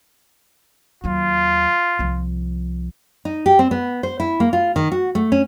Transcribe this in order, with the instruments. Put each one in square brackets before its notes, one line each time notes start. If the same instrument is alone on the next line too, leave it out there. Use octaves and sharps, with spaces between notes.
[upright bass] D#2 F#3 [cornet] F4
[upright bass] C2 F3
[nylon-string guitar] D#4
G4
C4
B3
C5
E4
A#3
F4
D#3
F#4
A3
C#4